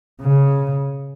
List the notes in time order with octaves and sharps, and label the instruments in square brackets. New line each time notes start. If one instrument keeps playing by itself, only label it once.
[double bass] C#3